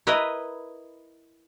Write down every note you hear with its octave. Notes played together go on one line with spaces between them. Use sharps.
E4 A#4 B4 D#5